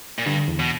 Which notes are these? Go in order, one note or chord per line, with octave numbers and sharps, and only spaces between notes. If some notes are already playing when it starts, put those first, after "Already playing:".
A#2
G2 D3
E2
B2